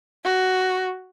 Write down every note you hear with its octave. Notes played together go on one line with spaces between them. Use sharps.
F#4